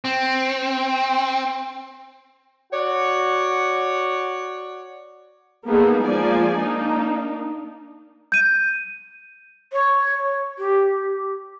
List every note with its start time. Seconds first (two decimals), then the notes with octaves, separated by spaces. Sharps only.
0.05 C4
2.72 F#4 C#5 D5 F#5
5.66 A#3 B3 D#4 G#4 A4
6.02 F3 G#3 A#3 D5 G#5
6.56 A#3 D4 D#4
8.32 G6 D#7
9.72 C#5
10.58 G4